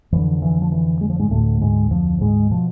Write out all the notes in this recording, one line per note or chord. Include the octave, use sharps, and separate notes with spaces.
F2 D3 E3
E3
F3
E3
G#3
F3
G#2 G#3
D2 A2 D3 A3
G#2 G#3
F2 F3
G#2 G#3
B2 F3